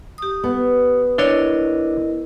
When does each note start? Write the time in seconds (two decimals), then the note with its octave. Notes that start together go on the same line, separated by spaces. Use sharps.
0.18 G4 D#6
0.44 B3
1.18 D4 E4 A#4 C#5 D#5